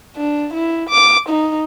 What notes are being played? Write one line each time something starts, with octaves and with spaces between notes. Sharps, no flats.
D4
E4
D6
D#4